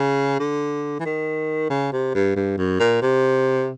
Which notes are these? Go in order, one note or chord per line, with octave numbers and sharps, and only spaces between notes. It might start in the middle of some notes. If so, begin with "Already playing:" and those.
Already playing: C#3
D3
E3
D#3
C#3
C3
G2
G2
F#2
A#2
C3